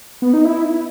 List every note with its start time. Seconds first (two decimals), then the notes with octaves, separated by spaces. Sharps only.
0.22 B3
0.33 D#4
0.45 E4